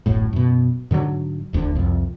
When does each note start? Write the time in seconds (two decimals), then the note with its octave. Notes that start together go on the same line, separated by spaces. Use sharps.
0.06 D1 A1 F#2 A2
0.33 F#2 B2
0.91 G#2 D3 E3 F#3
1.53 E1 D2 B2 D3
1.75 C2 F2